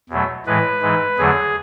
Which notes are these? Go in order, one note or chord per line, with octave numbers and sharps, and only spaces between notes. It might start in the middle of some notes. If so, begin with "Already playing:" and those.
E2 B2 F#3 A3
A2 E3 G#3 B4
G#2 E3 G#3
E2 D3 F#3 A3 G#4